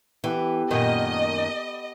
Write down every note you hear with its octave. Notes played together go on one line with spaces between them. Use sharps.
E3 B3 G4 A4
F#2 A#2 D#3 D#5